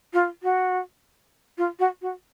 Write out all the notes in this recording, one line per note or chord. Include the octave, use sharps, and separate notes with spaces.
F4
F#4
F4
F#4
F#4